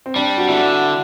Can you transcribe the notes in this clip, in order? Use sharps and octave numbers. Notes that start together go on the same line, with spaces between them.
C4
G3 D4
F#4
D3 E4